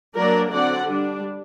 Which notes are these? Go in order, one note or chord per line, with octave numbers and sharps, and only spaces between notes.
F#3 A#3 D4 A#4 D5
D3 F#3 C4 D5 F#5
G3 D4